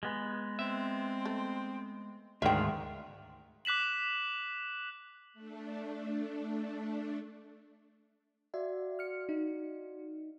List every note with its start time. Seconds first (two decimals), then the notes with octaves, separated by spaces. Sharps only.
0.03 G#3 B3
0.59 C4 E5
1.25 A3
2.42 D2 G#2 D#3 D4 F4 E5 G5
3.65 D6 F#6 B6 E7 F#7
5.34 A3 D4
8.54 F#4 D5 E5 F5
8.99 F6 C#7
9.29 D#4